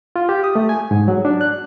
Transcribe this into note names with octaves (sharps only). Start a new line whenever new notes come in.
F4
G4
D#6
A3
G#5
G#2
F#3
D4
F#6